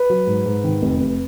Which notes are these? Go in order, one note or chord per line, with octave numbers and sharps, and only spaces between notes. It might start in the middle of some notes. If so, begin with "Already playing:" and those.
Already playing: B4
F#3
G#2
G#2
D#3
F1
F1